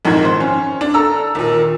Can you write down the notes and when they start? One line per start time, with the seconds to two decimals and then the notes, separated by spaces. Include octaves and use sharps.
0.05 A#1 F2 G#2 D#3 G#6
0.25 C5
0.40 C#4
0.81 D4
0.94 A4 A#5 E6
1.35 D#2 A#2